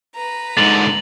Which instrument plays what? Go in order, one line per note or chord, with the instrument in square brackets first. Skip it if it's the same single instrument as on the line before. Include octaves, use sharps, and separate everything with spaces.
[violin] B4 A#5
[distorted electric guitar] G#2 D3 [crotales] A6 F7 F#7